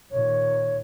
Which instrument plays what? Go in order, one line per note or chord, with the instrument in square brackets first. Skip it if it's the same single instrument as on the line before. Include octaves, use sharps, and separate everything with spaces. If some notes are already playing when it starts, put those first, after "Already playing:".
[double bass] A#2 D#3 [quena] C#5